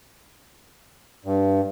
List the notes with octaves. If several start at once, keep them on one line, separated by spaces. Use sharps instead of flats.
G2